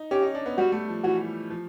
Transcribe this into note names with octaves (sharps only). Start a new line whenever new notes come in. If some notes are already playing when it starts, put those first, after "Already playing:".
Already playing: D#4
C#4 G4
D#4
D4
B3
G3 F#4
A3
F3
E3 F#4
F3